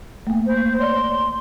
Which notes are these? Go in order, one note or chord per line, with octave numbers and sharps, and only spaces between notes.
A3 A#3
C5
C#5 D5 C6